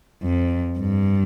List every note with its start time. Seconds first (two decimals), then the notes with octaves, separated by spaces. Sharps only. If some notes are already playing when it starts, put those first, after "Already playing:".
0.23 F2
0.79 G2